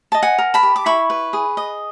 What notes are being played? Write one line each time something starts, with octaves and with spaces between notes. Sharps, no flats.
D#5 A5
F#5 G#5
A#4
A5 B5
G4
D6
E4 B5 C#6
B4
G#4
D#5